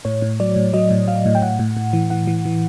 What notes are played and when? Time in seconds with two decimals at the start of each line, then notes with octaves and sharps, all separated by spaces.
0.05 A2 C#5
0.22 A2
0.40 F#3 D5
0.56 A2
0.73 F#3 D#5
0.90 A2
1.08 F#3 F5
1.26 A2
1.35 G5
1.42 A2 F#5
1.59 A2
1.77 A2
1.93 E3
2.10 E3 F#5
2.27 E3
2.45 E3